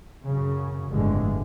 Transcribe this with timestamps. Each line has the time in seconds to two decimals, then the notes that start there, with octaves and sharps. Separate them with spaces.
0.24 F#2 C#3
0.89 G1 F2 A2 D3 G#3